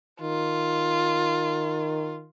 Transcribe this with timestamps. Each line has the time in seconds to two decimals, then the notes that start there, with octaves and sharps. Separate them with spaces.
0.21 D#3 F4